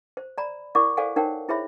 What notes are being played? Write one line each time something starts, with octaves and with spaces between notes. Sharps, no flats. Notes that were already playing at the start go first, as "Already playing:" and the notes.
C5
D5 A#5 B5
E4 A#4 D5 F#5 C#6 D6
A4 C5 D5 F5 F#5 G#5
D#4 A#4 C5 C#5 F#5 G5
E4 G#4 C5 C#5 E5 B5